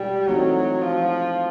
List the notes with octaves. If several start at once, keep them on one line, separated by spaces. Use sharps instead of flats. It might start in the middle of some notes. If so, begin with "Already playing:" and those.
Already playing: B2 G3 G#3 C#4 F4
E3 F#3 A3 C4 D#4 F#4
F3